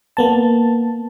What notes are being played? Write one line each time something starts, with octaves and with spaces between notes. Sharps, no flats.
A#3 B3 A5